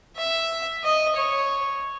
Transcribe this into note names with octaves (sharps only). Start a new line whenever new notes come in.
E5
D#5
C#5